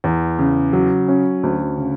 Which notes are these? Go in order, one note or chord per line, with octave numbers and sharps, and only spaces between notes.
E2
C#3
F#3
C#4
D2
C#3